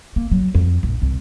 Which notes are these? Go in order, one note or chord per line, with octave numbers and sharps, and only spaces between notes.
A#3
F#3
F2
A#1
C2